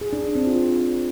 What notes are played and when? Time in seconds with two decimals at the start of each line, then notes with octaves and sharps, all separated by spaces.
0.01 G#4
0.13 D4
0.24 D4
0.35 C4
0.47 F4